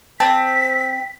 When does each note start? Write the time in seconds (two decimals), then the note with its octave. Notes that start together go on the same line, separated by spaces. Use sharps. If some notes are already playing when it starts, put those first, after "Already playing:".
0.20 C4 A5 B6